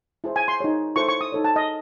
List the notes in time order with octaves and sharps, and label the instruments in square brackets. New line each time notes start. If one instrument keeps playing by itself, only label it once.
[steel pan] E4 G#4 C5
G#5
C6
D#4 G#4 C#5
E4 A4 C5 C#6
C#6
D#6
D#4 A4 C#5
A5
D#5